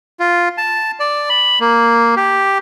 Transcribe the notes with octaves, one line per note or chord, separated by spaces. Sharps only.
F4
A5
D5
B5
A#3
G4